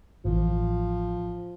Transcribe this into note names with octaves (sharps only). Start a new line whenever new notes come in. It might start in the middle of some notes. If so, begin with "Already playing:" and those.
A1 E3 F3